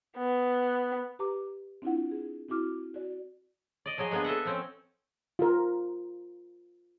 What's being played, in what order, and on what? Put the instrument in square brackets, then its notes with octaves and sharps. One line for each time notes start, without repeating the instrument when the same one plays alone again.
[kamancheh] B3
[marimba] G4 B4 A#5 D6
C4 D4 E4 F4 F#5
G#4
C4 E4 F#4 D6 F6
F#4 D5
[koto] D5 D#5
F3 F#3 G#4 D#5 G#5
G#3 A#3 B3 D4 G#4
A4 D#5 E5 F#5
F3 C4 C#4
[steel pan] F4 A#4